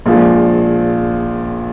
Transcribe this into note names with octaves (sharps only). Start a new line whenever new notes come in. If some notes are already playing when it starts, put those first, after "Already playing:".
A#1 A#2 F3 G#3